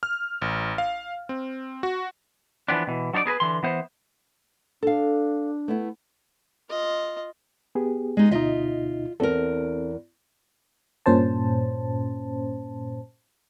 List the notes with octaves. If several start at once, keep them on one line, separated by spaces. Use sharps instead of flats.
F6
A1
F5
C4
F#4
E3 F3 B3 D4
B2 E3
F#3 D4 D#4 C#5 D5
B3 G#4 A#4 B4
D3 E3 C6
E3 B3 C5
D4 A4 F5
A3 B3 E4
F4 D#5
B3 G4 G#4
G#3 D#4
D2 B2 D#4 F4 D#5 E5
E2 C4 A4 A#4
G2 A#2 C#4 C5 A5